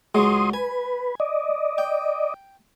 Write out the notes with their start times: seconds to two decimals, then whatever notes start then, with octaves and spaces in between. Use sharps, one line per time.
0.15 C#2 F#3 G#3 C6 D#6
0.53 B4 G#5
1.20 D5 D#5
1.78 G5